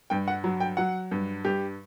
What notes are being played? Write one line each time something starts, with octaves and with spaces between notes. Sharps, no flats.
G2 G5
F#5
F#3
G5
F#3 F#5
G2
G2 G4